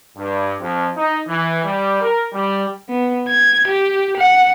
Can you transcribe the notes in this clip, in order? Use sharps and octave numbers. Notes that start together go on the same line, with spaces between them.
G2
F2
D#4
E3
G3
A#4
G3
B3
G#6
G4
F#5